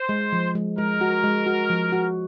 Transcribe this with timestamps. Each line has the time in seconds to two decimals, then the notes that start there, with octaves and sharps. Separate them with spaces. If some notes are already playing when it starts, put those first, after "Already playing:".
Already playing: C5
0.09 G#3
0.33 F3
0.55 G#3
0.78 G#3 A#4
1.01 F#4
1.24 G#3
1.46 F#4
1.70 F3
1.92 F#4